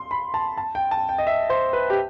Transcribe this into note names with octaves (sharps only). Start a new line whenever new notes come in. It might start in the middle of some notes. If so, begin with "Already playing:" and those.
Already playing: C6
B5
A5
A5
G5
A5
G5
D#5
E5
C5
B4
G4